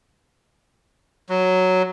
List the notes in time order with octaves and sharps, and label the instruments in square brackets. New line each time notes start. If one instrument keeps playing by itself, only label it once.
[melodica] F#3